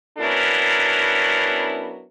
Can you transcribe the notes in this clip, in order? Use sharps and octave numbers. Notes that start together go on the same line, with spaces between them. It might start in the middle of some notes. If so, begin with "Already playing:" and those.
F#3 B3 C#4 D4 E4 A#4